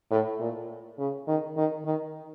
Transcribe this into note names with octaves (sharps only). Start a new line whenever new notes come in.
A2
A#2
C#3
D#3
D#3
D#3